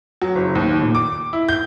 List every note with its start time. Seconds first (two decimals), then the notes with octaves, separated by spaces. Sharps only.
0.22 F#3
0.35 F#1
0.55 D#2
0.82 A#2
0.95 D6
1.33 E4
1.49 G6